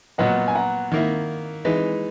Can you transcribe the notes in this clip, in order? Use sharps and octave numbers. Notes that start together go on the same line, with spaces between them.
A#2 F#3 B3 D#5 F#5
G#5
F#5 A#5
D#3 A#3 E4
E3 G#3 D#4